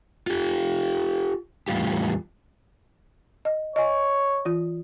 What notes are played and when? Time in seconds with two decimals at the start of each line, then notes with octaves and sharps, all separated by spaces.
0.27 F4 G4
1.68 E2 A2 G3 F4 G4
3.45 D#5
3.76 C#5 D#5 G#5
4.45 E3 F4